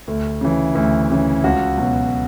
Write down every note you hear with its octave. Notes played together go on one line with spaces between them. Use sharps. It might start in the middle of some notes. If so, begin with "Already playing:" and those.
D2 A3
C#3 E3
D2
C#3 E3
C#2 F#4
B2 F#3